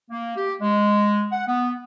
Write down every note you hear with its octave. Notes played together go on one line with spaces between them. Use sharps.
A#3
G4
G#3
F#5
B3